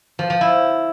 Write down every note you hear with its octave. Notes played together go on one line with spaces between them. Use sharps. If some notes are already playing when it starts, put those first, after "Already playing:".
F3
F3
E4